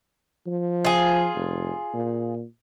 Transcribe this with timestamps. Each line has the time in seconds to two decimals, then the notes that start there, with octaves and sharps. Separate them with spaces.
0.47 F3
0.85 F4 G#4
1.35 F1
1.94 A#2